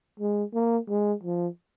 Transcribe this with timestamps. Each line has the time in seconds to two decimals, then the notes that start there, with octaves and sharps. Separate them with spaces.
0.20 G#3
0.54 A#3
0.89 G#3
1.24 F3